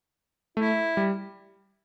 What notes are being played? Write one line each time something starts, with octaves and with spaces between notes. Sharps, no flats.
A3 E4
G3